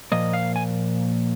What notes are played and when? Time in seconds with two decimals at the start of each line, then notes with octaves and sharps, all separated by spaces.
0.12 A#2 F3 A#3 D#5
0.33 F5
0.56 G#5